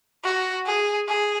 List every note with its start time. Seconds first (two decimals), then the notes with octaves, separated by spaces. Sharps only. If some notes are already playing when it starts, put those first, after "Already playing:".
0.24 F#4
0.66 G#4
1.08 G#4